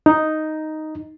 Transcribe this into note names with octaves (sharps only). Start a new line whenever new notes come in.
D#4